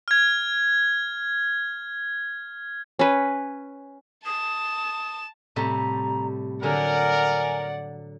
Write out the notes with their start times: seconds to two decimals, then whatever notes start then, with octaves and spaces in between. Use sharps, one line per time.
0.08 F6 G#6
2.99 C#4 B4
4.26 A5 D#6 E7
5.56 A2 C3 G3 A#5
6.63 D3 F#3 A#4 D5 F#5 G#5